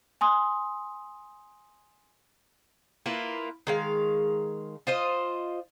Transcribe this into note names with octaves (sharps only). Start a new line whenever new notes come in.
G#5 C6 D#6
A#3 E4 F4 B4
D#3 G#3 F5
F4 C5 D#5